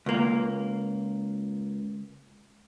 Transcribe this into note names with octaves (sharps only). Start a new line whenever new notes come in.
C#2 A#3